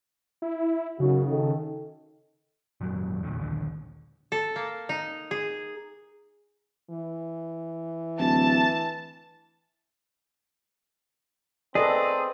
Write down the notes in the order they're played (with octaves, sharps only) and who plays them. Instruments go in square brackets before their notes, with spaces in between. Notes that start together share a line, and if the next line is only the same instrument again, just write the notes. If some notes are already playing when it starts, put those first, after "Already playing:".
[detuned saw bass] E4
[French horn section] F#2 D#4 F#4 [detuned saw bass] C#3
[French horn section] D#3 A4
[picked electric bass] G#1 F#2 A#2 F#3
E2 A#2 D3
A#1 D#2 D3
[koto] A4
A#3
D#4
G#4
[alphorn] E3
[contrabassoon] D1 [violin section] A5
[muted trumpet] C4 [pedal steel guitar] G#4 [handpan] A4 B4 D#5 [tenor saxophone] D5